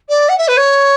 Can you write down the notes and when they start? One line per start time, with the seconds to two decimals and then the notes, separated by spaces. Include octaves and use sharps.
0.08 D5
0.28 F#5
0.37 E5
0.47 B4
0.57 C#5